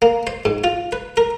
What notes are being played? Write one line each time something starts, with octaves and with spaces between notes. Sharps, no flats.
A#3
C5
G#2
F4
B4
A#4